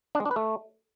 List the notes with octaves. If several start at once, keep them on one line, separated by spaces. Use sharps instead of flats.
D4
G#3
D4
B4
A3